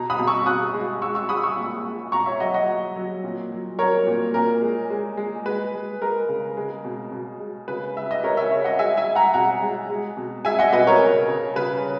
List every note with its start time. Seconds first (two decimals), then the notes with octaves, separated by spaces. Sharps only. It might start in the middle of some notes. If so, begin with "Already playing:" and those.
Already playing: B2 A#5
0.10 B5 D#6
0.19 B2
0.27 C#6 E6
0.46 B2 D#6 F#6
0.74 G#3
1.02 G#3 C#6 E6
1.15 C#6 E6
1.29 G#3 B5 D#6
1.43 C#6 E6
1.57 A#2
1.86 G#3
2.12 B2 A#5 C#6
2.26 C#5 E5
2.40 F#3 D#5 F#5
2.54 D#5 F#5
2.69 F#3
2.96 F#3
3.24 A#2
3.52 F#3
3.79 F#3 A#4 C#5
4.07 A#2
4.34 A#2 A#4
4.62 G#3
4.90 G#3
5.17 G#3
5.46 G#3 B4
5.74 G#3
6.02 G#3 A#4
6.29 C#3
6.57 G#3
6.85 B2
7.12 B2
7.39 G#3
7.68 C#3 B4
7.95 G#3 E5
8.11 D#5
8.23 C#3 A#4 C#5
8.37 C#5 E5
8.51 G#3 C#5 E5
8.64 D#5 F#5
8.79 G#3 E5 G#5
8.97 E5 G#5
9.06 G#3
9.15 F#5 A#5
9.34 B2 F#5 A#5
9.62 G#3
9.90 G#3
10.17 B2
10.45 G#3 E5 G#5
10.59 D#5 F#5
10.72 B2 B4 D#5
10.87 A#4 C#5
11.01 C#3
11.28 C#3
11.56 C#3 B4